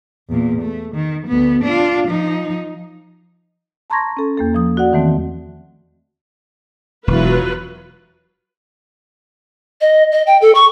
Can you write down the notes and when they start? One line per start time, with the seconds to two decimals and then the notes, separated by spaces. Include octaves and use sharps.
0.29 E2 A#2
0.62 A3
0.95 D#3
1.27 D2 B3
1.64 D4 F4
2.08 F3 D#4
3.90 A5 A#5 C6 C#6 G#6 A#6
4.17 C#4 A4
4.37 E2 A#3 A4
4.55 F3 D#6
4.77 F#4 D5 F#5
4.93 D#3 E3 A3 C4
7.08 E1 E3 F#3 F4 B4
9.81 D#5
10.12 D#5
10.27 G5
10.42 A4
10.55 C#6